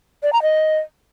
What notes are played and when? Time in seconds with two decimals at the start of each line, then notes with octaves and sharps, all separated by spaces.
0.23 D5
0.33 A#5
0.43 D#5